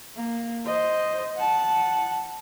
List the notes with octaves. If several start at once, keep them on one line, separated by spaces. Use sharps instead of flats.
A#3
C5 D#5
F#5 A5